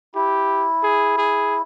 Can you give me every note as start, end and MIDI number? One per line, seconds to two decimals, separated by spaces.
0.15 1.62 64
0.15 0.68 67
0.83 1.13 68
1.18 1.60 68